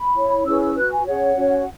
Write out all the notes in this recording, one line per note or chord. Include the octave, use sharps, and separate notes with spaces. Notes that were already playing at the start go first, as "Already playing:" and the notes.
Already playing: B5
E4 C#5
C#4 E4 G#4 B4 E6
E6
F#4 B4 F#6
G#5
C#4 G#4 C#5 F#5
C#4 F#4 C#5